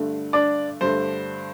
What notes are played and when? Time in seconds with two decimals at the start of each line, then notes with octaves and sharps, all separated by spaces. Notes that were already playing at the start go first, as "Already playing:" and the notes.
Already playing: G2 D3 A3
0.33 D4 D5
0.81 G2 D3 A3 C5